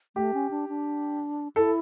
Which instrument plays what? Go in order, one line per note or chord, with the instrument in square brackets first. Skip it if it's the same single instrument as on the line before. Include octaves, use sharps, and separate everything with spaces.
[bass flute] A3 [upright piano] G4
[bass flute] C#4
D4
D4
[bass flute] E4 [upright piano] A4